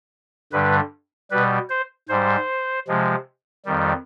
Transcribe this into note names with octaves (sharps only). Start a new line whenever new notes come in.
G2 D3 G3 B4
B2 G3 B4
C5
G#2 G3 C5
C3 F3 G#3
F2 D#3 G3